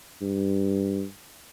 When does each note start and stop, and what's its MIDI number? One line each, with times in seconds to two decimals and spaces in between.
0.21 1.03 43